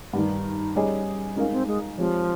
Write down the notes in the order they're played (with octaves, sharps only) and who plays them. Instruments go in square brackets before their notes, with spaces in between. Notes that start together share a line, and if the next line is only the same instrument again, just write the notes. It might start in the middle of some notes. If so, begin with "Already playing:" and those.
[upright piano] G2 D#3 G3 [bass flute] D#4
[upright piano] G3 C#4 G#4 D#5
[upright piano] G#3 D#4 A#4 F5 [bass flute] C#4
[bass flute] C4
G#3
[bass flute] F3 [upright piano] G#3 C4 G4 C#5